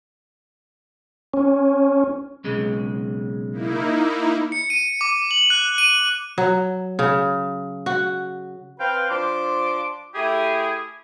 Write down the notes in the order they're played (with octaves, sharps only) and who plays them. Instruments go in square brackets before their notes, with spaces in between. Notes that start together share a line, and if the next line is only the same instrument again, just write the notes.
[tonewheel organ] C#4
[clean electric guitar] B1 C#3 G#3
[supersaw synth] A#3 D#4 E4
[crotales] C#7
D#7
D6
F#7
F#6
D#7
[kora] F#3
C#3
F#4
[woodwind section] C4 B4 C5 F5 G5
F3 D4 C6 D6
A3 E4 G4 G#4